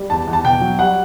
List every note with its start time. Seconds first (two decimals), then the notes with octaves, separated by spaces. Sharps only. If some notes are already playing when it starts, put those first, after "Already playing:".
Already playing: G3
0.10 E2 A5
0.27 E2
0.33 A5
0.44 B2 G5
0.61 F#3
0.79 G3 F#5